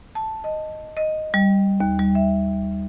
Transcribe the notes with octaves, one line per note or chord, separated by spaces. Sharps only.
A5
D#5
D#5
G3
D#2
G3
E5